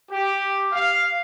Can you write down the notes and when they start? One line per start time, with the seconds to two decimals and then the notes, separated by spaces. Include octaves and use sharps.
0.11 G4
0.72 F5